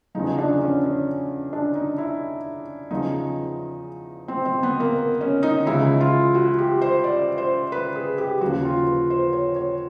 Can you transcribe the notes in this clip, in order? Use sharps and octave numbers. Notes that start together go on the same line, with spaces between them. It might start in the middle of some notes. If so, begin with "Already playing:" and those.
E2 C#3 F3 D#4
D#4
D4
C#4
C#4
D4
D#4
E4
E2 C#3 F3 D#4
C4
C4
B3
A#3
C#4
D#4
C#2 C#3 E3 E4
F4
F#4
G4
C5
D5
C5
B4
G#4
G4
D#2 C#3 F3 F#4
F4
B4
C5
C#5
C#5